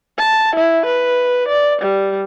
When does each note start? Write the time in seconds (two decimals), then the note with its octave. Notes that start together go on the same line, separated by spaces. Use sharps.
0.19 A5
0.56 E4
0.86 B4
1.49 D5
1.82 G3